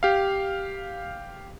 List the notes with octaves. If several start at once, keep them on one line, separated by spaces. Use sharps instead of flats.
G4 F5